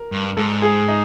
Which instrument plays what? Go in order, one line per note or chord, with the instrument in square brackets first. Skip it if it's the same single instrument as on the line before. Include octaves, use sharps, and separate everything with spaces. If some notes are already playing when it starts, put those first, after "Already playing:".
Already playing: [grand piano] A#4
[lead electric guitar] G2
[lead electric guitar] G#2 [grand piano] A4
[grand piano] G#4
D#4